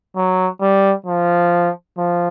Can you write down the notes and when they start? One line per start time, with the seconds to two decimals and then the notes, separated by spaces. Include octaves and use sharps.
0.16 F#3
0.61 G3
1.06 F3
1.98 F3